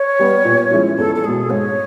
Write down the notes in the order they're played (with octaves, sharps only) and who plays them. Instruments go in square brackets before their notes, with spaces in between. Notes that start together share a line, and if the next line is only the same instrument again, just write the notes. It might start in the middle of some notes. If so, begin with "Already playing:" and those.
Already playing: [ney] C#5
[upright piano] G3 B3
A#2
F3 G#3 C#4 E4
[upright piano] E2 [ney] A4
[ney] A4
[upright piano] B2 G#3 [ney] G#4
[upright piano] G#2 [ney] C#5